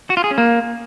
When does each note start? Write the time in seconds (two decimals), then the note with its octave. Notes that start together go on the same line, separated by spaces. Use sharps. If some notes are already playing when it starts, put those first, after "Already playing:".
0.10 F#4
0.17 F4
0.24 G#4
0.31 C#4
0.38 A#3